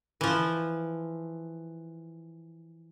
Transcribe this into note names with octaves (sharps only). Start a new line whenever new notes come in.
E3 F3